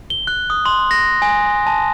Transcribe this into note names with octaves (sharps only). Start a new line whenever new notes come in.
G7
F#6
D#6
C6
A#6
G#5
A5